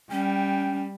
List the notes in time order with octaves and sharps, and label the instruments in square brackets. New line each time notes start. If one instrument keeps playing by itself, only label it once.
[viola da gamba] G3 [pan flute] C#4 [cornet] G5